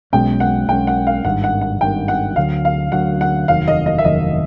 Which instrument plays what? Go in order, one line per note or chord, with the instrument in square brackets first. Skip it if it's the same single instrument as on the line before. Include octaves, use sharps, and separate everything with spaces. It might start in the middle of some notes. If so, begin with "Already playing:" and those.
[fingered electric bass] B1 B2 G#3 C#4 [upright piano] G5
[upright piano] F#5
[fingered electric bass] B1 B2 G#3 C#4 [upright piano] G5
[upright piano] F#5
F5
[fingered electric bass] G#1 G2 D#3 [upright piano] F#5
[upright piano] F#5
F#5
[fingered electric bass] G#1 G2 D#3 [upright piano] G5
[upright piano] F#5
[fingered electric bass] D2 D3 F#3 [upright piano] F5
[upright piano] F5
[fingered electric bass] D2 D3 F#3 [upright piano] F#5
[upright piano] F#5
[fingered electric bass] F1 D#2 D#3 F#3 [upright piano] F5
[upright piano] D#5
D#5
E5
[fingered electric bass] F1 D#2 D#3 F#3 [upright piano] D#5